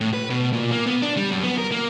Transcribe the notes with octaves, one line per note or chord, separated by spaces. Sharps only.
A2
B4
B2
A#2
A#3
B3
D4
G3
F#2
B3
A#4
A#3